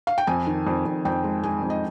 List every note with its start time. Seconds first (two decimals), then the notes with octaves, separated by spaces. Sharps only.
0.07 F5
0.18 G5
0.27 F2 G#5
0.47 D#3
0.67 F2
0.86 F2
1.05 F2 G5
1.24 G#3
1.43 G#3 G#5
1.63 F2
1.70 D#5